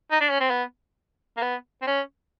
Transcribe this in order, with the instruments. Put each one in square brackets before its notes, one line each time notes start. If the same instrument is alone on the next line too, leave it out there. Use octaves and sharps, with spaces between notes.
[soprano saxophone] D#4
D4
C#4
C4
B3
A#3
B3
C4
C#4